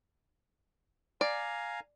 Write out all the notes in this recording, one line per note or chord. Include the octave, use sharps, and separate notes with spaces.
D5 F5 G#5 A#5